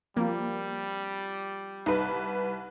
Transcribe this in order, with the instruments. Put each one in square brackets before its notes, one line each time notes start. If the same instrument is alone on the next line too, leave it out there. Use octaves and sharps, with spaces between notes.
[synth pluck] F3 C4 F4 [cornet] G3 [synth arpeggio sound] A#3
[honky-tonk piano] C2 B4 [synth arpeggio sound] D#4